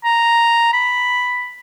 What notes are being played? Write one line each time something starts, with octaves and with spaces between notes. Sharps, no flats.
A#5
B5